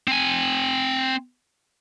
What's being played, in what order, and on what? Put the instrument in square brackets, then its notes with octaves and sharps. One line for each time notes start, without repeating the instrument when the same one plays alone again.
[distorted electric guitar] C4 G#5